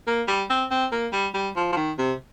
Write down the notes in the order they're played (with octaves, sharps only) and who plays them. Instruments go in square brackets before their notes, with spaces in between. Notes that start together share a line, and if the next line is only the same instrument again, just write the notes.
[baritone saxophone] A#3
G3
C4
C4
A#3
G3
G3
F3
F3
D#3
C3